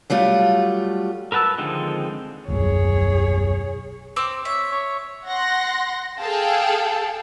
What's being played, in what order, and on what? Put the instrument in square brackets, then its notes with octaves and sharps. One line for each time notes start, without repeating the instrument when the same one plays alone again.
[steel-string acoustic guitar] F#3 G3 A3 F4
[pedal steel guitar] A#4 B4 F#5 A5 E6
D3 D#3 F3 G#3 C4
[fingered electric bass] D#1 B1 F#2 [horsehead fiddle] G#4 C#5
[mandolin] C4 D6 E6
[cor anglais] C#5 [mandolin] E5
[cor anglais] C#5
[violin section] F#5 C6 A#6
G#4 A4 F5 G5 A5